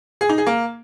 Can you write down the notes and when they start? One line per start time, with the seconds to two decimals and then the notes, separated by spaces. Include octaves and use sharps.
0.21 G#4
0.29 D#4
0.38 G#4
0.46 A#3